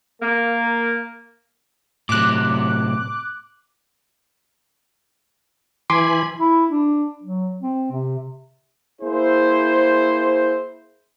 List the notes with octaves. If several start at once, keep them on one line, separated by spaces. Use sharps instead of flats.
A#3
A2 C3 F#3 D6 F#6
E3 G#5 B5 C6 D6
E4
D4
F#3
C4
C3
A#3 E4 G#4 C5